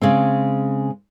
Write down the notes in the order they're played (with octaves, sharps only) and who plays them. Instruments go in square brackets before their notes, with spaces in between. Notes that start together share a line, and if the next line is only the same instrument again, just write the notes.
[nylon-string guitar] C#3 G#3 C4